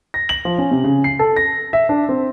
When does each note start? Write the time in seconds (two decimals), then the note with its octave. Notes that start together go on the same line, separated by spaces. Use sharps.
0.14 A#6
0.29 F#7
0.45 F3
0.58 C#4
0.71 C3
0.84 C#3
1.04 C7
1.19 A4
1.37 A#6
1.73 E5
1.89 D4
2.09 C4